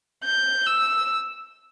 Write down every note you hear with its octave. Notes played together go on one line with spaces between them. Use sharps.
G6
E6